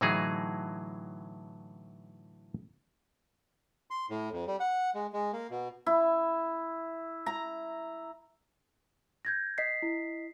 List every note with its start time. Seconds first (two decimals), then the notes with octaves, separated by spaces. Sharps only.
0.01 A2 D3 E3 F#3 D#4 G#4
3.90 C6
4.10 A2
4.32 F2
4.47 G3
4.60 F#5
4.95 G#3
5.13 G#3
5.33 A#3
5.51 B2
5.86 E4
7.26 A#5
9.25 G6 G#6 A#6
9.58 D#5 B6 C7
9.82 E4